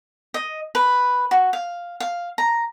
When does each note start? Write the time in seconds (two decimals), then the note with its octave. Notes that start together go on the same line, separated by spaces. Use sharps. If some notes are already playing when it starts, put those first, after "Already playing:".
0.34 D#5
0.75 B4
1.31 F#4
1.53 F5
2.00 F5
2.38 A#5